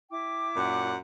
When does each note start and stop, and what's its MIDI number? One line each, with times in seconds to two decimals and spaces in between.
0.10 0.91 64
0.10 0.91 79
0.10 0.91 86
0.56 0.95 42
0.56 0.95 46
0.56 0.95 78